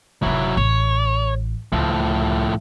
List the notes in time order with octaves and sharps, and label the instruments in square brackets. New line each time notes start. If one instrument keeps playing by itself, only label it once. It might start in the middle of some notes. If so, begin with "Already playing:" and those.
[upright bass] F1 D#3 [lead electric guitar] F#3 E4
[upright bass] A1 [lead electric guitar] C#5
[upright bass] C#2 [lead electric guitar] A2 F3